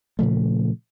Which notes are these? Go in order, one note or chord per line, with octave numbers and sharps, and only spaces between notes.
A#2 C#3 F3 A3